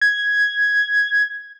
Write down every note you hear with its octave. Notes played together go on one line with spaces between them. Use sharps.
G#6